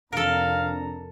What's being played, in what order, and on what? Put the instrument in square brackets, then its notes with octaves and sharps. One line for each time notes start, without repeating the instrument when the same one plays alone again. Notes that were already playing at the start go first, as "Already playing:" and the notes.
[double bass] F1 [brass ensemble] C4 D4 A#5 [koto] A4 A#4 [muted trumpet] F5